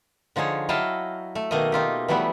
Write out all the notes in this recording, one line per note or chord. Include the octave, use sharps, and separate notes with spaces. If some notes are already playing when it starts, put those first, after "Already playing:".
D3 F3 D#4 G#4 C#5
F#3 E4 D#5 F5 G5 A5
A3
B2 D#3 A3 A#3 D#5
D#4 F4 G4
E3 F#3 G3 A3 B3